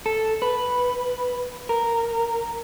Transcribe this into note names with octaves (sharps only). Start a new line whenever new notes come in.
A4
B4
A#4